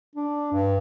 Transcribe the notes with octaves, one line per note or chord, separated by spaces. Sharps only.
D4
G2